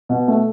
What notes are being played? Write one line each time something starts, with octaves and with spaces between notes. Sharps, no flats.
B2
A3